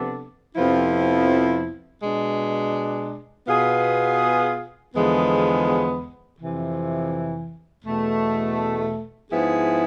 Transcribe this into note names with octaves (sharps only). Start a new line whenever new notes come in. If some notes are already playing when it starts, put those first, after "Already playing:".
Already playing: C3 F3 B3 D4 A4
F2 C3 F3 B3 E4
B2 G#3 D4
B2 B3 F4 G#4
E2 D3 F3 G#3 B3
F2 C3 E3
E2 B2 A3
G#2 F3 B3 E4 G#4